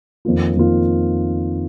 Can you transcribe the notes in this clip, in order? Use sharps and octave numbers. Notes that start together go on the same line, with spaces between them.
F2 D#3 A#3 F4
F2 D#3 A#3 F4